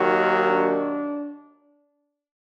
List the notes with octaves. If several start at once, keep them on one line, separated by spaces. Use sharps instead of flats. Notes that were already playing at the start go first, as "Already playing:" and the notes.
Already playing: D#2 D#3 F#3
D4